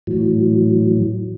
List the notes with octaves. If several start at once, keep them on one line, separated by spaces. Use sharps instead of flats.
A2 E3 F#3